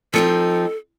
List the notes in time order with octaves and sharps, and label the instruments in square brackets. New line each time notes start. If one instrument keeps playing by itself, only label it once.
[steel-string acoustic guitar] F3 C4 D#4 [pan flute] A4